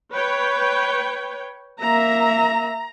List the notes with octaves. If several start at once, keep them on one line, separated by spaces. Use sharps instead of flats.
B4 C#5 G5
A#3 E5 A#5